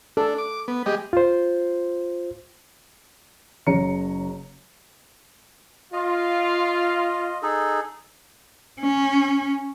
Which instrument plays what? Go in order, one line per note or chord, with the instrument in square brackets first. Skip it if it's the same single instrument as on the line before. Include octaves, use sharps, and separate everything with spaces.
[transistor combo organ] D4 [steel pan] A4
[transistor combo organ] D6
B3
G#3 G4 D#5
[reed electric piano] F4 C5
[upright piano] F#1 C#3 C#4 C#5 A#5 C#7
[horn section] F4 [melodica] D#5
[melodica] D#4 G#4 A4
[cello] C#4